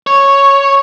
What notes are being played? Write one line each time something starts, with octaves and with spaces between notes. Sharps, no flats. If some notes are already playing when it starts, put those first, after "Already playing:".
C#5